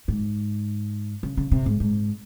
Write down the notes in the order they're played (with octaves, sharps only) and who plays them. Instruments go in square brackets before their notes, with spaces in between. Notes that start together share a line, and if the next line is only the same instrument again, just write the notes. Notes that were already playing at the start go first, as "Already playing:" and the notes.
[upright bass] G#2
C#3
C#3
C3
G#2
G#2